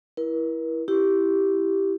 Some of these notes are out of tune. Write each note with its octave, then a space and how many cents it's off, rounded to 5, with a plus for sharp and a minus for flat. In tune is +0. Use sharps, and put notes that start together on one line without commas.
E4 +0 A#4 +45
E4 +0 G4 -5